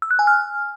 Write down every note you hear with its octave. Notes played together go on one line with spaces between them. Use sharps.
E6
F#6
G#5
F6